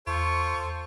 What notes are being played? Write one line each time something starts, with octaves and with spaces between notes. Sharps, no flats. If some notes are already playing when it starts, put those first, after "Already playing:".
E2 F4 A4 C5 C#6